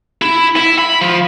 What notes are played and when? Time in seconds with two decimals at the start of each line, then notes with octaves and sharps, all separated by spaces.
0.22 E4
0.56 E4
0.79 B5
1.01 F3